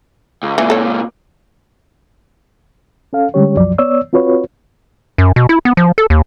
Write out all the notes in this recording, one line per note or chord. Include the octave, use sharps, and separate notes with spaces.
C#2
C#2 A#2 E3
A4 C#5
C#4 A4 F5
D3 G3 G#3 C#4 G4 C#5
C2 F#2 F3 F#3 D5
B3 C#5 D5 E6
C4 F4 F#4 B4 C#5
F#2
B2
E4
B3
F3
A4
D#2